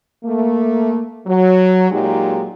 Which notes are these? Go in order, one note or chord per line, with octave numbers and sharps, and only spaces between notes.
A3 A#3
F#3
A#2 F#3 G#3 D#4 G4